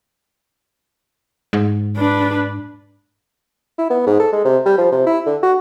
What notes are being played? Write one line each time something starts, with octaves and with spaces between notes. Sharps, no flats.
G#2
D4 B4
E4
B3
G#2
A4
G#3
C3
G3
F3
C3
E4
D3
F#4